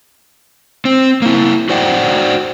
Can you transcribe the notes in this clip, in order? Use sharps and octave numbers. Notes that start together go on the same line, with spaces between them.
C4
A#3 E4
F#4 C5 D5 F#5 G5